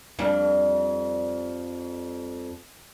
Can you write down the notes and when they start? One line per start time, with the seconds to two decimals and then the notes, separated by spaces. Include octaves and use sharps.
0.19 F2 G3 D4